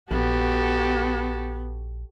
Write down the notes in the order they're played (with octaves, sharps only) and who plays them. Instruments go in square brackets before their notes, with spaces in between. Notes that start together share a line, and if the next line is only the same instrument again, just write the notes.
[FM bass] A#1 [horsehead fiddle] B3 [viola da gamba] F#4 G4 A4